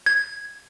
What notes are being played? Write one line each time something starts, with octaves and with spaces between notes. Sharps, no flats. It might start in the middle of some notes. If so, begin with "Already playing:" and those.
G#6